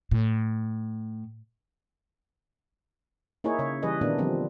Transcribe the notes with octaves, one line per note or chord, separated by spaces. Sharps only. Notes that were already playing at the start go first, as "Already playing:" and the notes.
A2
A#3 D#4 E4 G#4 C#5
C#3 C#5
E3 G3 G#4 B4 D#5
A#2 D#3 A#3 B3 D4
D3 F3 G3 C4